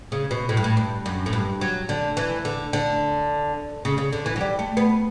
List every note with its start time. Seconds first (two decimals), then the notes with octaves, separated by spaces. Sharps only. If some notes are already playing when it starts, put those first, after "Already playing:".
0.12 C#3
0.31 B2
0.49 A2
0.57 G2
0.64 A2
0.77 G2
1.06 F#2
1.26 A2
1.33 G2
1.61 F#3
1.89 D3
2.17 E3
2.45 D3
2.73 D3
3.85 C#3
3.98 C#3
4.13 D3
4.26 E3
4.36 F#3
4.41 G3
4.59 A3
4.77 B3